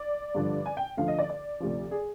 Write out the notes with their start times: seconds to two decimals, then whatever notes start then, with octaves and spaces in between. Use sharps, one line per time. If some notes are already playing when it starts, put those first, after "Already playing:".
Already playing: D5
0.35 G2 D3 F3
0.66 G#5
0.77 G5
0.97 D2 D3 F3 F5
1.08 D#5
1.19 D5
1.29 D5
1.60 D2 C3 F3
1.91 G#4